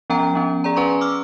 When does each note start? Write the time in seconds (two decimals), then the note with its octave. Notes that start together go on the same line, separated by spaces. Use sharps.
0.10 F3 B3 C#4 G5 A#5
0.34 F3 B3 C#4
0.64 G#4 D5 A#5
0.76 C#4 B4 G#5 A#5 C6 C#6
1.01 D6 E6 F6